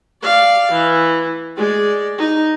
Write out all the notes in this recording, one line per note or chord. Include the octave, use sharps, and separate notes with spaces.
D5 F5
E3
G#3 D5
D#4